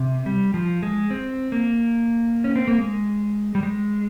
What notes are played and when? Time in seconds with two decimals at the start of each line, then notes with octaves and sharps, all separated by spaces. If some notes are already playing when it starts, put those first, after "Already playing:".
Already playing: C3
0.26 G3
0.54 F3
0.83 G#3
1.10 C4
1.52 A#3
2.44 C#4
2.56 C4
2.68 A#3
2.78 G#3
3.55 G3
3.63 G#3